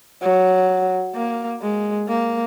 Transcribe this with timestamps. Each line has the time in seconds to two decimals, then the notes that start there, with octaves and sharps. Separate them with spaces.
0.22 F#3
1.15 A#3
1.62 G#3
2.08 A#3